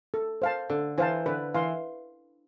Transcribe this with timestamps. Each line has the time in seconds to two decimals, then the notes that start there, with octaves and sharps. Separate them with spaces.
0.14 A4
0.42 C5 F5 A5
0.70 D3 A4
0.98 E3 C5 F5 A5
1.26 D3 B4
1.54 E3 F5 C6